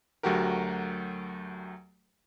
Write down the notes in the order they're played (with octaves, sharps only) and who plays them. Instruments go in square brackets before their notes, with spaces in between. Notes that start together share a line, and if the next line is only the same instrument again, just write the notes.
[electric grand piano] D2 F#3 A3 F#4 G4 A#4